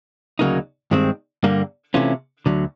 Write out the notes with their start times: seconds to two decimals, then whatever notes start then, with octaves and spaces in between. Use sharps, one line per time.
0.39 D2 C#3 F#3 A#3 D#4
0.91 G2 D#3 G#3 C4
1.43 G2 D3 G3 A#3
1.94 C3 E3 A3 C#4 F4
2.46 D2 D3 F#3